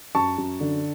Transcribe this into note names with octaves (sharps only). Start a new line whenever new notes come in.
F#2 A5 C#6
F#2
D3